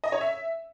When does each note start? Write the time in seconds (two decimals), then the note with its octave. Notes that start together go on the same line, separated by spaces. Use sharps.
0.04 D#5
0.12 C#5
0.21 E5